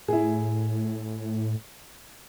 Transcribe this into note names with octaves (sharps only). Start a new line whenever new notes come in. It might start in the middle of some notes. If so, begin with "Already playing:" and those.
A2 E4 G#4